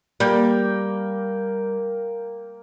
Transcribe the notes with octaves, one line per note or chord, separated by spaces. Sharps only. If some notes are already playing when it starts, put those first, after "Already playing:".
G3 A#3 G5